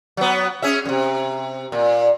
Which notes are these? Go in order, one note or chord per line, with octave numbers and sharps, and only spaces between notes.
F#3 B3
C#4 G#4 E5
F#2 C3
A#2